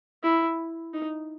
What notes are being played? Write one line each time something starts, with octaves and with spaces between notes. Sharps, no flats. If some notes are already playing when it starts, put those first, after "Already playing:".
E4
D#4